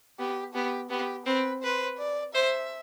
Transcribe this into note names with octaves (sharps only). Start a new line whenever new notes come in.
B3 G4
B3 G4
B3 G4
C4 B4
B4 C5
D5
C5 E5